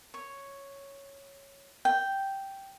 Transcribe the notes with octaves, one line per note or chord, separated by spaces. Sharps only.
C#5
G5